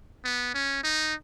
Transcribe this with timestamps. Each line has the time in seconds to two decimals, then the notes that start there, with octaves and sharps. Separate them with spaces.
0.25 B3
0.54 C#4
0.83 D#4